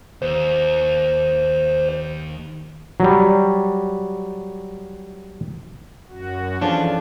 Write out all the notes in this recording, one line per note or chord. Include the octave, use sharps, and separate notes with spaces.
D#2 C5
F#3 G3
F#2 F#4
E3 F3 C#4 D4 G#4 A4